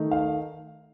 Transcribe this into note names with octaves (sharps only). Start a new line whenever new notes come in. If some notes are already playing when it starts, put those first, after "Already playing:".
Already playing: D#3 A3 D#4
F5